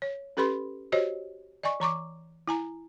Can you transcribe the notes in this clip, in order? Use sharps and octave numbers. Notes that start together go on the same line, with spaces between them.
C#5
C#4 G4 A4 B4 B5 C6
F#4 G4 C5 C#5 D#5
D5 D#5 G#5 C#6
E3 A#5 C#6 D6
E4 G#5 A#5